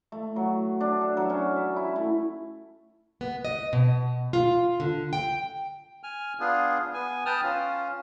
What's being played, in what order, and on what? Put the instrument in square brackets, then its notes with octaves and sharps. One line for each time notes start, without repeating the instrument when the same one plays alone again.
[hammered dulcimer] A3
F#3
D4
A4
F#3
C#4
E5
E4
A3
[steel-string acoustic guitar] B3
D#5
B2
F4
D3
G5
[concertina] G#5 F6
B3 D4 F4 G#4
B3 G#5
B4 G5 A5 D#6 F6
C#4 F4